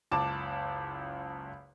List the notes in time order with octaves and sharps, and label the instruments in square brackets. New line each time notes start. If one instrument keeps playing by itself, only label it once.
[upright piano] F#1 C#2 A5 D6 E7